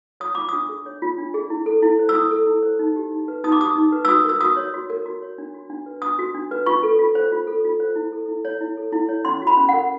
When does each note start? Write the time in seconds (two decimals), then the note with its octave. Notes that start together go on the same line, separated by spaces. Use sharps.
0.20 C#5 D#6
0.35 F4 D6
0.49 D4 D#6
0.69 G#4
0.86 C#5
1.02 F4
1.18 D4
1.34 G#4
1.50 E4
1.66 A4
1.83 E4
1.99 C5
2.09 E6
2.15 E4 D#6
2.31 A4
2.47 E4
2.63 C5
2.79 D#4
2.96 G4
3.11 D#4
3.28 B4
3.44 D#4 D#6
3.52 D6
3.60 G4 D#6
3.76 D#4
3.92 B4
4.05 E6
4.08 F#4 D#6
4.25 A#4 E6
4.41 F#4 D#6
4.56 C#5
4.74 F#4
4.90 A#4
5.06 F#4
5.22 C#5
5.38 D4
5.54 F#4
5.70 D4
5.86 B4
6.02 D4 D#6
6.19 F#4
6.35 D4
6.51 B4
6.66 F4 C#6
6.83 A4
6.99 F4
7.15 C5
7.32 F4
7.47 A4
7.64 F4
7.80 C5
7.96 E4
8.12 A4
8.29 E4
8.45 C#5
8.61 E4
8.77 A4
8.92 E4
9.09 C#5
9.25 C#4 C6
9.42 F#4
9.47 B5
9.57 C#4
9.69 A#4 F#5